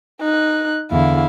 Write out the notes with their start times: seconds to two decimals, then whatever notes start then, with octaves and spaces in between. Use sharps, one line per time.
0.21 D#4 F#6
0.91 E2 D3 E4 F5